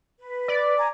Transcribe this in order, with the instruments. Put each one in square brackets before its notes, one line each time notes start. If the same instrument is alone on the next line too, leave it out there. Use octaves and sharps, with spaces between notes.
[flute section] B4
[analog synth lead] D5
[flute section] G#5 A#5